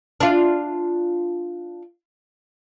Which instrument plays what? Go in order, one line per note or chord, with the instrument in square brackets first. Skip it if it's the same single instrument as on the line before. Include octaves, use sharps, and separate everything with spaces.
[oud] D4 F4